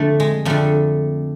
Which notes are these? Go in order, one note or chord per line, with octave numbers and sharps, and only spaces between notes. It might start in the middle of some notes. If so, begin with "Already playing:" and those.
Already playing: F2 D3 A3
G#3
F2 D3 A3